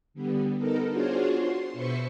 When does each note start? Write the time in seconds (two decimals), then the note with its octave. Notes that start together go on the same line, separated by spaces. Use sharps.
0.14 D3 G3 B3
0.57 B3 D#4 A4 A#4
0.91 D4 F4 F#4 G#4 C5 C#5
1.36 C6
1.73 B2 B4 C5 E5 C#6 C#7